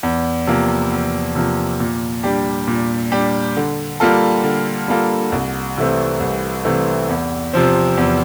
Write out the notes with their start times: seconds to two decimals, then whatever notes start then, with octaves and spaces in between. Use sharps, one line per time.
0.03 E2
0.47 C3 F3 A#3
0.91 E2
1.35 C3 F3 A#3
1.80 A#2
2.23 G3 D4 G4
2.68 A#2
3.12 G3 D4 G4
3.57 D3
4.00 G3 A#3 F4 A4
4.44 D3
4.88 G3 A#3 F4 A4
5.32 C2
5.77 C3 E3 A3 C4
6.20 C2
6.65 C3 E3 A3 C4
7.09 E2
7.53 C3 F3 C4
7.98 E2